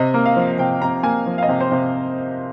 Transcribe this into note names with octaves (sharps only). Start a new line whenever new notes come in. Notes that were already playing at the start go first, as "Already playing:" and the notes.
Already playing: C3 D#5
A#3
F5
F3
C3 G5
C3 A#5
A#3 G#5
F3
F5
D#5
C3
C5
C3